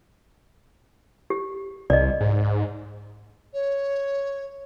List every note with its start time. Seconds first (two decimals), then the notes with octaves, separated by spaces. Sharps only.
1.30 G4
1.90 C2 D5 D#5
2.21 G#2
3.53 C#5